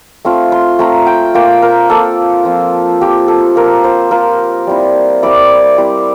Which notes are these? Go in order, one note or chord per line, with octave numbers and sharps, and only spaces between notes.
A3 C4 F4
C6
A3 C4 F4 A#5
G5
A#3 F4 G5
A#4
A#3 F4 A4
F3 C4 F4
F3 C4 F4 G4
A4
A#3 F4 A#4
C5
A#3 F4 A#4
G3 C4 E4
G3 C4 E4 D5
G3 C4 E4